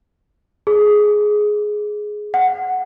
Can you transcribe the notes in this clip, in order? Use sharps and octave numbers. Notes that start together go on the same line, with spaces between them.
G#4
F#5